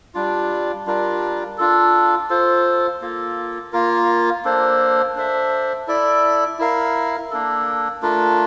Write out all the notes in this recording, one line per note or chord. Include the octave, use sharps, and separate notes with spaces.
G3 D4 F4
G3 D4 F4 A#4
D4 F4 A4
F4 A4 C5
A#3 F4 A4
A#3 F4 A#4
A#3 D4 A4 C5
D4 A4 C5 E5
E4 A4 D5
E4 A#4 F5
A#3 D4 A4
A3 D4 F4 A#4